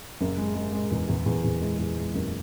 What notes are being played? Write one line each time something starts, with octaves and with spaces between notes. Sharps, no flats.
F#1
G#3
G#3
G#3
E2
E2
E2
E2
G#3
E2
G#3
F#1